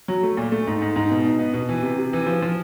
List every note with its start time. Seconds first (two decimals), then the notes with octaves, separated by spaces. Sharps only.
0.08 F#3
0.23 A3
0.37 A#2
0.52 A3
0.67 G#2
0.82 G#2
0.96 G#2
1.11 B2
1.25 D#4
1.39 B3
1.54 B2
1.69 E3
1.83 C3
1.98 C3
2.13 E3
2.27 F3
2.42 F3